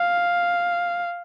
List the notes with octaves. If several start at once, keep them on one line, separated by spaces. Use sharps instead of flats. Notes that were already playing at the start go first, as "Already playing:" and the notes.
Already playing: F5